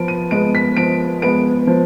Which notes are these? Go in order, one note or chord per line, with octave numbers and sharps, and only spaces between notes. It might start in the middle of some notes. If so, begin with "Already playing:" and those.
Already playing: F3 B3 D7
D#7
G#3 B3 D7
B6
F3 D7
G#3 B3 D7
F3